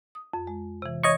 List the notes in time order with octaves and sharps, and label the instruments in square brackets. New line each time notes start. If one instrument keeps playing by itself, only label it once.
[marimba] D#6
F2
G#3
C3 E3
[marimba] E3 [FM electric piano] C#5 D#5 C#6